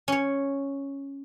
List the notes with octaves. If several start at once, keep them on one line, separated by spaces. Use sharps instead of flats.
C#4 C#5